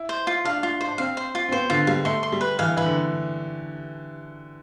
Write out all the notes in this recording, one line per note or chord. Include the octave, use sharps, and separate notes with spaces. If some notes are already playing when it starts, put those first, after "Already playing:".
Already playing: E4
C5
F4
D4 F5
F4
C5
D4
C4 F5
C5
F4
C4
B3 C5
D3 F4
G3 F5
A3 C6
C6
G3
B4
E3 F5
E3 B4
D3